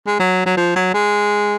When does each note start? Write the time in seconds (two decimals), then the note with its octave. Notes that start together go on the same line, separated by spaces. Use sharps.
0.07 G#3
0.20 F#3
0.46 F#3
0.57 F3
0.76 F#3
0.94 G#3